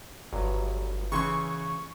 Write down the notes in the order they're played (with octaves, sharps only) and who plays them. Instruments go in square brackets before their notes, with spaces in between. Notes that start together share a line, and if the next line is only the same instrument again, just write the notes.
[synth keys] G1 [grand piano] F#3
[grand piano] C#3 E3 C6 [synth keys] C#6